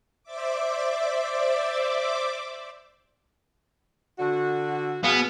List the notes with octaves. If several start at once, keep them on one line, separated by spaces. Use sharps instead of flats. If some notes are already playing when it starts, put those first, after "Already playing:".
C5 D5 E5 D6
D3 F#4
B2 B3 G#4 F5